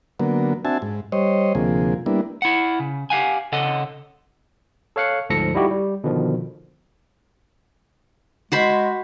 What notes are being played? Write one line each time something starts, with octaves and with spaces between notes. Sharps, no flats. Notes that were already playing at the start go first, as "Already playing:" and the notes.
D3 F#3 A#3 B3
C4 D4 F#4 E5 G#5 A5
G#2
G3 C5 C#5 D#5
D2 C3 F3 A#3 G#4
G3 A#3 B3 D4 E4
E4 F#5
C#3
G4 F5 F#5 G#5
C#3 A4 D#5 F#5
A4 C#5 F5 F#6 C#7
D2 G#2 F3 A4 A#6 C#7
G3 D#4 E4 F#4 G4
G3
B2 D3 D#3 F3
G#3 F#4 C5 B5